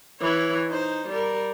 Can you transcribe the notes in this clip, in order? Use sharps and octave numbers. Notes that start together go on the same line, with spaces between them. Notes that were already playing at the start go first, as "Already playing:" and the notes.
E3 C#5
D#4 C5
G3 A#4